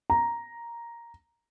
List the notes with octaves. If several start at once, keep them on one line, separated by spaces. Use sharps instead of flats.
A#5